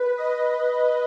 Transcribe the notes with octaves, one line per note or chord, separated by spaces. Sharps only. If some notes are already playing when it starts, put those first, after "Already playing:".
Already playing: B4
D#5